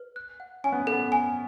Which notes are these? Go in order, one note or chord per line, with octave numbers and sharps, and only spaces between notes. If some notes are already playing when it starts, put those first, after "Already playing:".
Already playing: B4
F#6
F#5
C#4 G#5
B3
B3 A4
G#5